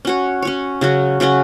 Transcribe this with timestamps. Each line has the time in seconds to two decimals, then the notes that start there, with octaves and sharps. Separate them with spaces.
0.05 C#4 F#4 C#5
0.42 C#4 F#4 C#5
0.81 C#3 F#3 C#4 F#4
1.20 C#3 F#3 C#4 F#4